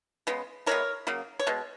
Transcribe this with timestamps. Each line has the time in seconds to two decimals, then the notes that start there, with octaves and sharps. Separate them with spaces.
0.27 C#3 G#3 B3
0.66 E3 G#3 B3 A#4 C#5
1.07 C#3 F#3 A#3
1.39 C#5
1.47 B2 G#3